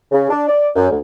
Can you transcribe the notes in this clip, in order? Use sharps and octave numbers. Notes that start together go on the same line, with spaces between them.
C#3
D4
D5
F#2
D2